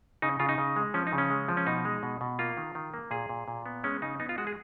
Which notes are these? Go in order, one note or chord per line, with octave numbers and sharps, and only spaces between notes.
C#3 D#4
C#3 F4
D#4
C#3
G#3
F3 C#4
D#4
C#3
C#4
G#3
F3
C#4
B2 D#4
G#3
B2
B2
A#3 F4
D#3
D#3
A#3
A#2 G#4
A#2
A#2
B3
G#3 C#4
C#3 D#4
B3 D#4
F4
G#3 F#4
G#4